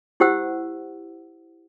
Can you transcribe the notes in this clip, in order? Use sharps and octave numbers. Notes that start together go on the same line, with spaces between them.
E4 G4 C5 F#5 E6